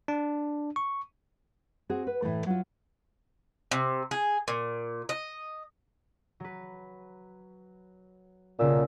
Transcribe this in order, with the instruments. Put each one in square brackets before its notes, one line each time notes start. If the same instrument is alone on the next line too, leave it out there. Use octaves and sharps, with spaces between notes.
[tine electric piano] D4
C#6
[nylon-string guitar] C4 F#4 G#4
B4
A2 E3 G#3 A3
F#3 F4
[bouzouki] C3
G#4
A#2
D#5
[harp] F#3 B4
[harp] B1 C#3 E6 [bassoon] A#2